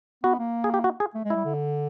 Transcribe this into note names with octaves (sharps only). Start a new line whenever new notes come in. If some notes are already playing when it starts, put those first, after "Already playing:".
B3 F#4
A#3
G#4
G4
F#4
G#4
A3
G#3
E4
G3
D3